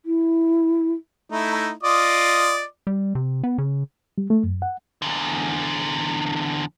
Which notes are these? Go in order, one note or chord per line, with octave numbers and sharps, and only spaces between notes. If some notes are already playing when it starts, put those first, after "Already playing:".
E4
A3 D#4 E4
F4 D5 D#5
G3
C3
B3
C#3
G3
A3
F#2
F#5
E2 D3